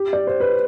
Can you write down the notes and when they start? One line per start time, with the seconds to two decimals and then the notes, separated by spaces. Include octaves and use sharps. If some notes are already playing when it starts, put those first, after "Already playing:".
Already playing: G4
0.13 D5
0.27 C5
0.40 B4